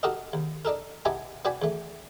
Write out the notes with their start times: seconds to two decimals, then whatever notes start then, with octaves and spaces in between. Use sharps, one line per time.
0.03 D#4 F#4 G4 A4 A#4 D#5
0.33 D#2
0.65 D4 D#4 A4 A#4
1.05 B3 D#4 E4 G4 G#5 A5
1.45 B3 F#4 D5 G5 G#5 B5
1.62 E2 A3